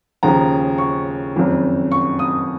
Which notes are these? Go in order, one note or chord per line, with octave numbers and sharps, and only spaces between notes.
D#2 C#3 F3 A#5
C#6
F#1 F2 D#3
C#6
D#6